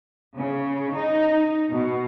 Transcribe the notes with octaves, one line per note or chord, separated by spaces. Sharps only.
C#3
D#4
B2